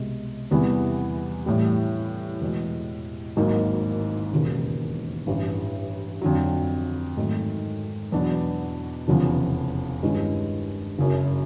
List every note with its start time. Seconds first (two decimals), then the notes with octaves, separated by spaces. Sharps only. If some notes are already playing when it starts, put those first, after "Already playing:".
Already playing: C2 B2 G#3
0.51 E2 C3 E3 G3 B3
1.46 A2 E3 G3
2.41 E2 B2 G#3
3.37 G#1 G#2 D#3 F#3 A#3
4.32 E1 D#2 C#3
5.27 A1 G2 E3
6.22 F2 D3 F#3
7.17 G#2 D#3 F#3 A3
8.12 E2 B2 F#3 B3 D4
9.08 F1 E2 C#3 F3
10.03 G2 D#3 G#3 C#4 E4
10.98 F#1 F#2 C#3